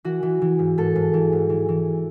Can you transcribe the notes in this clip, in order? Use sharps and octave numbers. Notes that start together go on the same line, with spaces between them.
E3 F#4
E3
E3
G#2
G#2 A4
G#2
E3
G#2
E3
E3